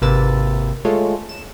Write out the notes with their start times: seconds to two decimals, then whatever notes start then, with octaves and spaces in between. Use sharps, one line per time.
0.02 G#1 C3 A#3 B4 E6 A6
0.85 G#3 A3 F4 A4 C#5
1.29 E7